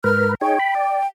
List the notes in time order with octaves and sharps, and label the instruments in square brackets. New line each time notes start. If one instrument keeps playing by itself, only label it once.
[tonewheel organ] G#2 A#4 B4 [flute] F6
[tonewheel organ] D#4 G#4 C#5 [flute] G5
[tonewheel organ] B5
D5